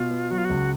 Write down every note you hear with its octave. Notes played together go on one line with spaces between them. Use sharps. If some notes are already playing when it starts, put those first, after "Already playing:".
Already playing: B2 F4
B3
F#3 F#4
F4
F#4
C#2